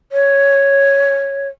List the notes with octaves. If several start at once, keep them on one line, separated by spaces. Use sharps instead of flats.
C#5